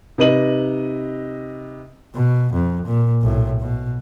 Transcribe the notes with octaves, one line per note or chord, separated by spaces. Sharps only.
C3 D#4 B4 D#5 D#7 F#7
B2
F2
A#2
B1 A2
B2